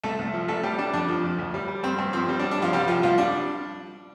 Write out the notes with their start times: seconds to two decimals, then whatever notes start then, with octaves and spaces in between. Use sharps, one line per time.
0.03 C2 A3 A4
0.19 C2
0.34 F3
0.48 A1 A3 A4
0.63 G3 G4
0.78 G3 D4
0.94 F2 D4
1.08 F3
1.24 F2
1.38 D2
1.54 G3
1.68 G3
1.83 G2 C4
1.99 G2
2.13 F3 C4
2.28 G3 C4
2.39 D4
2.43 G3
2.51 D4
2.58 G2 F3 F4
2.73 C3 G3 G4
2.88 F3 F4
3.03 C2 F3 F4
3.18 G3 D4